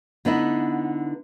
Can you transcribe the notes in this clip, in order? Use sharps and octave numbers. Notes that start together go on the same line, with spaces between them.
D3 B3 D#4 E4